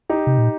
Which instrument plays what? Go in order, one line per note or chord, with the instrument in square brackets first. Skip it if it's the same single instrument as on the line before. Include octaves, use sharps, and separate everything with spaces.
[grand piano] D#4 G4
[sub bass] C3
A#2